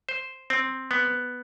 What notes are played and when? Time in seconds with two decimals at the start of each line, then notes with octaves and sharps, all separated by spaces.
0.09 C5
0.50 C4
0.91 B3